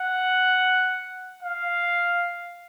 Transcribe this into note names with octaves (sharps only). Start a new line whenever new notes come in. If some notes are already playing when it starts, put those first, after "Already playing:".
Already playing: F#5
F5